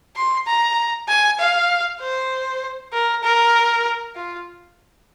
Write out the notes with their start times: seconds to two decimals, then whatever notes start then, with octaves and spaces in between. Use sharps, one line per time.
0.16 C6
0.46 A#5
1.08 G#5
1.39 F5
2.00 C5
2.93 A#4
3.23 A#4
4.15 F4